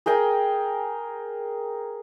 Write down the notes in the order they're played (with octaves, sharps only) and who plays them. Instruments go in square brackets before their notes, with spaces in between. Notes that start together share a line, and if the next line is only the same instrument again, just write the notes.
[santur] G#4 A#4 G5 G#5